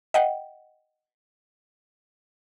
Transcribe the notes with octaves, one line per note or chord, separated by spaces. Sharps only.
D#5 F#5 G5